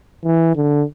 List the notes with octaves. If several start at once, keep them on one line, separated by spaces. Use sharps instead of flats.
E3
D3